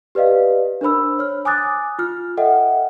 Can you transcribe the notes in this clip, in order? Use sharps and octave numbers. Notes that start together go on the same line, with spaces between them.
G4 B4 D5 D#5 F5
D4 A#4 C5 B5 E6
C#5 F6
G#5 D6 D#6 F#6 A6
F4 F6
A4 D#5 E5 F#5 G5